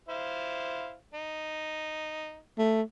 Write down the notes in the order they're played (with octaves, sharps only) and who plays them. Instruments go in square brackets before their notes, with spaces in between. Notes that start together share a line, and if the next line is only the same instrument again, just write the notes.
[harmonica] E4 C5 F5
D#4
[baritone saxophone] A3